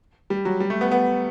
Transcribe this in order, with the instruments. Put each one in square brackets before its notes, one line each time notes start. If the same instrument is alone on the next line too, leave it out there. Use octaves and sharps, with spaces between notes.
[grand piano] G3
F#3
G3
A3
B3
B3